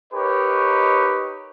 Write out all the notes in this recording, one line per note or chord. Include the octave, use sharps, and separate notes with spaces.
D#4 G4 A#4 B4 C#5 D#5